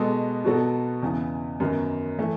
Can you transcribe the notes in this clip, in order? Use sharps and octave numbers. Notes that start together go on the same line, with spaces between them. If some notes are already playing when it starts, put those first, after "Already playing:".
Already playing: B2 G#3 B3 F#4 A4
B2 F#3 B3 F#4 A4
E2 C#3 E3 B3
F#2 D#3 F#3 B3
E3 A3